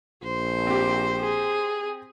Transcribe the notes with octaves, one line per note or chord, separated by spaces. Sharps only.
A#1 C5
C4 G4
G#4